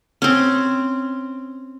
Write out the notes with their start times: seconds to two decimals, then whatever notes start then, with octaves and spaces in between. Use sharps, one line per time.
0.22 C4 C#4